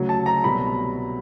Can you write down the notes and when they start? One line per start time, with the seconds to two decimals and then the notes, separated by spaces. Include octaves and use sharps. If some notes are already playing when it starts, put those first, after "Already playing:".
Already playing: D2 C#3 F#3
0.09 A5
0.26 A#5
0.44 C2 B2 F#3 B5